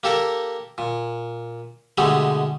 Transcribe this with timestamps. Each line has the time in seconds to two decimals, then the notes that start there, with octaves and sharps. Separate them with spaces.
0.03 A#3 G4 A4 A#4
0.78 A#2
1.98 B2 D3 G#3 A3 G4